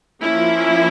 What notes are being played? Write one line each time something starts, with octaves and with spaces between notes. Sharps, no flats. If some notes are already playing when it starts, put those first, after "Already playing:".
F3 A#3 C#4 E4